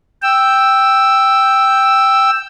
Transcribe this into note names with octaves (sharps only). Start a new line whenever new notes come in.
G5 E6